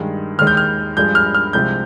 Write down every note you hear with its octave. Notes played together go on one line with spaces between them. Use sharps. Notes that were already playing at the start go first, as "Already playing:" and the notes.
Already playing: G2 D#3 G#3
D#2 D#3 G#3 F6
G6
F6
G2 F3 G#3 G6
F6
F6
C2 C3 F3 G#3 G6